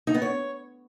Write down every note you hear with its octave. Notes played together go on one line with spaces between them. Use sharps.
D#4
B3
C#5